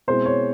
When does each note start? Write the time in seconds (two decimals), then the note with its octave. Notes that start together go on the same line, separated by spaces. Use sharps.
0.08 B2 G#3 C4 E4 C5
0.26 C#5